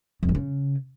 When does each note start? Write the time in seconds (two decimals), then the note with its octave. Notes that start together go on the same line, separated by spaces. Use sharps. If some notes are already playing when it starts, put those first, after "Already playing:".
0.23 F2
0.29 G2
0.35 C#3